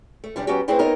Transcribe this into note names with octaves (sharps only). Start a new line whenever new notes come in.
A3
F#2 C3 G3 D4
F#3 B3 C#4 F#4 G4
A3 C4 E4 G#4 B4 C5
B3 C4 D#4 A#4 C#5 D#5